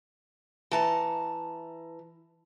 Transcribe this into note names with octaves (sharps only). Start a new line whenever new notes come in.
E3 A5 A#5